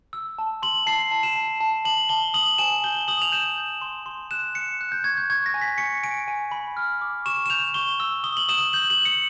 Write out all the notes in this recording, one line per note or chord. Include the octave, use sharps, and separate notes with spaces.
E6
A5
C6 F#7
A5 C7
A5
E7
A5
A5
A5 F#7
A5 G7
D#6 F#7
G#5 E7
G6 G7
D#6 F#7
F7
G6 E7
G6
C6
C6
F#6 E7
F#6 C#7
F#6
G6
C#6 G#6
G6
C#6 G#6
A#6
G#5
B6
C#6 C#7
G#5 D7
G#5
B5
F6
D6
C#6 E7
E7
G6 F7
C#6 G7
E6
D#6 G7
F#7
D#6 E7
G6 F#7
F#7
D#6
C#7